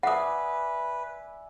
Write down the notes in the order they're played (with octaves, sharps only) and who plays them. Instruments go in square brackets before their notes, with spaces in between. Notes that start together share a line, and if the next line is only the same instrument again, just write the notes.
[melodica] B4 [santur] D5 E5 G#5 [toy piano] F#5 D#6